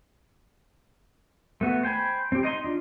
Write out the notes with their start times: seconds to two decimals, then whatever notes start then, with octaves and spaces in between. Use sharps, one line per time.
1.61 A3 B3 F#4
1.83 C5 G5 G#5 B5
2.32 C4 G4
2.43 D#4 D#5 C6
2.64 D4 F4